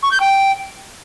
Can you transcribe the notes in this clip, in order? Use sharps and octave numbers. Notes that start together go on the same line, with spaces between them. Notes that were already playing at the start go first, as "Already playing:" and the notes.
C#6
G6
G5